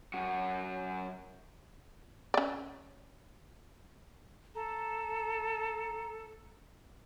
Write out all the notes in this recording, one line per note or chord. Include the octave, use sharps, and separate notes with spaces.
F#2 F#4
C#4 D5
A4 A#5